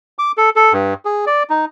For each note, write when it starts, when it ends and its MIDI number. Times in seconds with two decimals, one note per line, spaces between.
0.19 0.32 86
0.38 0.50 69
0.56 0.73 69
0.73 0.94 43
1.05 1.25 68
1.27 1.43 74
1.50 1.65 63